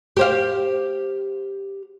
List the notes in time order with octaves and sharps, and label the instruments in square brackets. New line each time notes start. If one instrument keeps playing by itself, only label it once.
[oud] G4 C5 F5